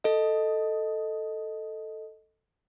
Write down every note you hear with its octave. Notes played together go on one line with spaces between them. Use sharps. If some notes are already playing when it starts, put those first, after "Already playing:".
A4 D#5